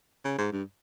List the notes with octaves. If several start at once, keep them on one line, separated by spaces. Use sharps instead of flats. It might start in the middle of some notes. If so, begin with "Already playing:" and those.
C#3
G#2
G2